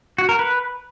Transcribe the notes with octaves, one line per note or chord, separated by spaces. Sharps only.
F#4
A#4
B4